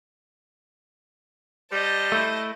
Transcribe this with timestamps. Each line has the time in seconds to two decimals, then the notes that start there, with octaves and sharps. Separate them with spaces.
1.72 G3 C5 D#5 A5
2.12 A3 E4